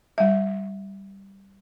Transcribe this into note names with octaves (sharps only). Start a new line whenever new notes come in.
G3 E5